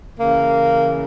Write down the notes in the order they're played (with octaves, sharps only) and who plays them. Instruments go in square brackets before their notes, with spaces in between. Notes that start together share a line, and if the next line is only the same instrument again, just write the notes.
[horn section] C#3 E3 A#3